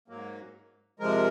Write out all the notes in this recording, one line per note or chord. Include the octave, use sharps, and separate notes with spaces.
G#2 F#3 A#3
C3 F3 G#3 A#4